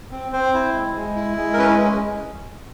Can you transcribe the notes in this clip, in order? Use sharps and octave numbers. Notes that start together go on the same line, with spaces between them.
C4
C4 C5
E4
G#3
G#3
E4
G#3
A#4
C#4 B4